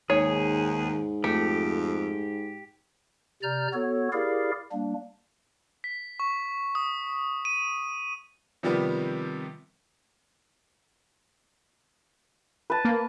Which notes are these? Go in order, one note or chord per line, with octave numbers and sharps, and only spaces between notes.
D#2 G#2 G#4 C#5
F2 A3 G4
C3 D5 A#5 F6 G6
B3 F#4 A4 C#5
E4 G4 G#4 A#4 D5 F5
G3 A#3 D4
B6
C#6
D#6
D#7
C3 D#3 F3 G3 B3
B4 A5
A#3